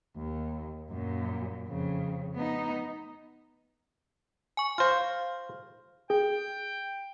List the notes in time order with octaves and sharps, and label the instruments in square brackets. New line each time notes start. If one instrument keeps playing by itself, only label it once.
[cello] D#2
F#2 A#2
F2 C#3
B3 D#4
[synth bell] G#5 C#6
[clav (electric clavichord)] F4 C5 [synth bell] F5 F6
[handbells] G#4 [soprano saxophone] G5